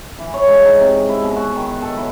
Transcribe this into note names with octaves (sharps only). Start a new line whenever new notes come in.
E3
C#5
G#3
D#4
C3
E4
B2
F#4
D#3
A4
E4